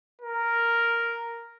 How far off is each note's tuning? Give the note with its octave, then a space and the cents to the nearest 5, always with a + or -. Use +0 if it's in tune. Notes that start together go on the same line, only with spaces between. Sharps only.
A#4 +0